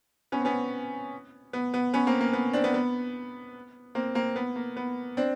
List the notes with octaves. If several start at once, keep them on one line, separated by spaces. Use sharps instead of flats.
B3 C#4
C4
B3 C#4
B3
B3
B3 C#4
A#3 C4
A#3
B3
C4 D4
B3
B3
A#3 C4
A#3 C4
B3
A#3
B3
C4 D4